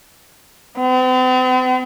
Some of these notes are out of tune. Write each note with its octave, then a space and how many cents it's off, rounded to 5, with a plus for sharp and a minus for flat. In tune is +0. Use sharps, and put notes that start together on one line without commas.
C4 -45